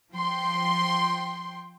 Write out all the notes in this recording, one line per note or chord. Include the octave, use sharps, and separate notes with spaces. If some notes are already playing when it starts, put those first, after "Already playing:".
F3 G5 C6